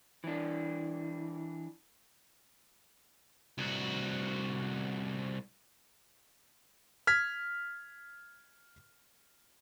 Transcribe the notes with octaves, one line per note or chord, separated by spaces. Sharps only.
E3 D4
C2 F#4
F6 G#6 B6